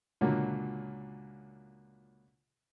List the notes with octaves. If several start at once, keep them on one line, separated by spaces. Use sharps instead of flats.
C#2 A#2 D3 F#3 A#3